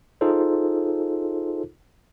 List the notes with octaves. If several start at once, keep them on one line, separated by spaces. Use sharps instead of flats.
D#4 F4 G#4 A4 C5